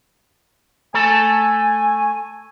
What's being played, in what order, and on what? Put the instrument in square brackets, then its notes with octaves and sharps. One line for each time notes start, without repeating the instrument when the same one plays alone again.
[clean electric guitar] A3 A4 A5 [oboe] G#5